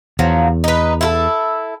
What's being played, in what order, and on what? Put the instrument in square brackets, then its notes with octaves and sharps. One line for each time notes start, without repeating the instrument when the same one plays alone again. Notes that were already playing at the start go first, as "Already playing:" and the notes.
[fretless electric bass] E2 [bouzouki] F3 F#3
[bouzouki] D#4 B4
E4 F4 A4